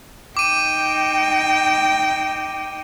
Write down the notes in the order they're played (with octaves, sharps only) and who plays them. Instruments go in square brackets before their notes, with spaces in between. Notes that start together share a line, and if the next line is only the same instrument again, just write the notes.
[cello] D#4 G5 [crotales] D6 D#7